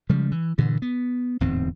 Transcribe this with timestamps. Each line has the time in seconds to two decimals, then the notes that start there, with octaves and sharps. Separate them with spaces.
0.10 C#3 F3 G3 G#3
0.32 E3
0.58 G2 A#2 D3 E3
0.82 B3
1.40 D1 E2 G#2 C4